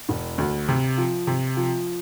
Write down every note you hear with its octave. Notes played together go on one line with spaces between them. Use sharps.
E1
D2
C3
F3
C3
F3